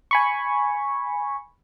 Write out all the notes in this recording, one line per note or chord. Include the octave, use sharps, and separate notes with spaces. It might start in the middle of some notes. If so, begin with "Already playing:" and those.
G#5 B5 C#6